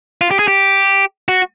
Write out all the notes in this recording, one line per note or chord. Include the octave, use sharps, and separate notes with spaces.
F4
G4
G#4
G4
F#4